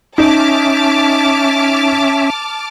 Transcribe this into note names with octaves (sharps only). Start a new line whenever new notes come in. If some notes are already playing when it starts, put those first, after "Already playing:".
C#4 D#4 E5 A5 D6 F6